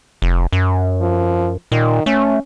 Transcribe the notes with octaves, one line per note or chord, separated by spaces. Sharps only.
F1
F#2
F3
A#2 D#3
A3 C#4